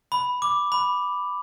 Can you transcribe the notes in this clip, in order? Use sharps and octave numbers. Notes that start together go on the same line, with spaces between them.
B5
D6
B5